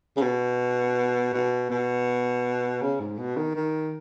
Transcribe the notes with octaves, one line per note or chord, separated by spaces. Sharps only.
C#3
B2
B2
B2
C#3
G#2
B2
D#3
D#3